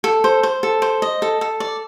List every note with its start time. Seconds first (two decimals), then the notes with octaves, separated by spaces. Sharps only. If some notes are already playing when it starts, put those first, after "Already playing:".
0.04 A4
0.24 C5
0.43 C5
0.63 A4
0.82 C5
1.02 D#5
1.22 A4
1.41 A4
1.60 D5